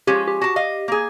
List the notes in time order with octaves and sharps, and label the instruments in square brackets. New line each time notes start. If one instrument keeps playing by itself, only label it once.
[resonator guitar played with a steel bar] F3 G#3 C#4 [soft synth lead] G4
[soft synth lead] G4
[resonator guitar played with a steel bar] F#4 A5
D#5 F5
A#3 G#4